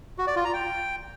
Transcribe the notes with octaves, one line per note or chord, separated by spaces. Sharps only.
F#4
D5
F4
A#5
G5